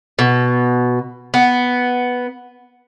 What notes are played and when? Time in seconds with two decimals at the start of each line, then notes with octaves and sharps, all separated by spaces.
0.19 B2
1.34 B3